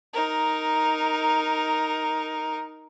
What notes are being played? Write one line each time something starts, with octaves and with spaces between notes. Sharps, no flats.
D#4 A#4